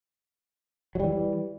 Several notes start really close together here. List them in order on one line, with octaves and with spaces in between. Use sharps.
F#3 G3 E3